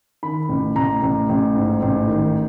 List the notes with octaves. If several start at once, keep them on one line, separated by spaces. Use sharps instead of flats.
D#3 B5
A1
A1 A#5
A1
A1
G#2
A1
D#3